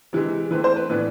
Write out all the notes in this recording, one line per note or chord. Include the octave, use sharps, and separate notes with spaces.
C3 E3 G#3
E3 A3 C4 B4
C5
B4
A2 E3 B3 D4 B4